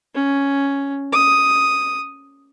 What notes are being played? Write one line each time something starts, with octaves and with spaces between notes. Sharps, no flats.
C#4
D#6